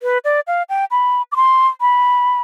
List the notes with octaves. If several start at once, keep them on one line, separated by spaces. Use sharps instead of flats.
B4
D5
F5
G5
B5
D6
C6
B5